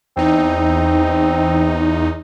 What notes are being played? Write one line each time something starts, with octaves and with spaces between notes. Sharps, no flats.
E2 C4 D#4